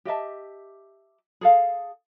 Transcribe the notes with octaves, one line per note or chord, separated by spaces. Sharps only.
G4 D#5 E5 A5
G#4 A4 F5